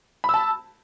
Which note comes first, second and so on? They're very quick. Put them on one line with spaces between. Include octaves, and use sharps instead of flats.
B5 E6 A5